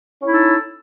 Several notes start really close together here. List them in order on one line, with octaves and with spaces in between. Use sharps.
C#4 E4 D#4 A4